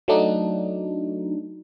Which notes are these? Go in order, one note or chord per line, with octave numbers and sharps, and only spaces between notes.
F#3 A3 D4 D#4